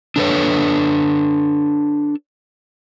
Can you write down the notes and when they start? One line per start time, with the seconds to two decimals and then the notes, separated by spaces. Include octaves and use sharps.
0.16 D4 A4 B4 C#5